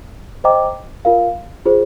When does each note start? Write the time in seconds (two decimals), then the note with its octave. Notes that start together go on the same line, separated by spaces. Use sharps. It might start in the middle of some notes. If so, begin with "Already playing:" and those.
0.44 C5 D#5 G5 A#5 D6
1.05 F4 A#4 F5
1.65 F4 G#4 C5